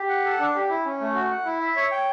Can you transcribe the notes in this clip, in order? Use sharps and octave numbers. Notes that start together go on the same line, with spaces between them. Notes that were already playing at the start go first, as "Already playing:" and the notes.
Already playing: G4
F#5
A4
D4
G4
E4
C#4
A3
F#4
F#5
E4
E5
C#5
G5